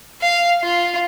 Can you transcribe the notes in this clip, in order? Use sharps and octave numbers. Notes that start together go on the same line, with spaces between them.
F5
F4